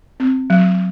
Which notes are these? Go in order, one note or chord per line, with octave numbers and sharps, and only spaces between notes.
C4
F#3